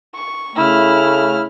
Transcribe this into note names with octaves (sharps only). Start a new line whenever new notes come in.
C#6
C#3 A3 E4 F6